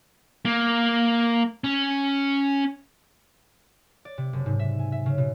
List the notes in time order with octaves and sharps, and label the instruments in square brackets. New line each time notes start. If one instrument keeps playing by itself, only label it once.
[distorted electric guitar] A#3
C#4
[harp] D5
C3
F#1
G#2
E5
G#5
E5
C#3
B2